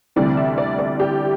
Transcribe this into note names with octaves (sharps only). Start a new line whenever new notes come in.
D2 C3 E3 G3 D5
E5
D5
D5
G4